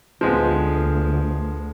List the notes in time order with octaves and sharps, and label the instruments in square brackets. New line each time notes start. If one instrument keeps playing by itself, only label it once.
[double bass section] D2 [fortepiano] F3 G#3 B3